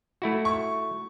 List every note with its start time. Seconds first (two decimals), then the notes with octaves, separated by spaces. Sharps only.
0.22 A3 E4 F#4
0.45 C#6